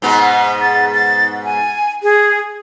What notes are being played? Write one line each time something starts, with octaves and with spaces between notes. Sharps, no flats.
G#2 B2 B3
A6
A6
G#5
G#4